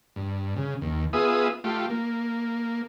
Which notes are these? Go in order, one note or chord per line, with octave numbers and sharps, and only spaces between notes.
G2
C#3
D#2
B3 F4 G#4 E5 D#6
A3 F4 G4
A#3